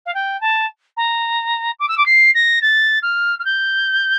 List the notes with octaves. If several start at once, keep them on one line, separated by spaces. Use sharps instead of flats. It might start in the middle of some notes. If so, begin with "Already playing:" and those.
F5
G5
A5
A#5
D6
E6
D6
C7
A#6
A6
F6
F6
G6